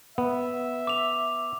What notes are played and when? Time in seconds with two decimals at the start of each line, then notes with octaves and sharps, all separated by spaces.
0.18 B3 E5
0.87 D6 F7